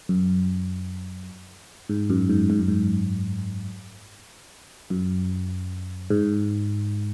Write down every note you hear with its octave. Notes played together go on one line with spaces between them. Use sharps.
F#2
G#2
F#2
G#2
G#2
F#2
G#2
F#2
G#2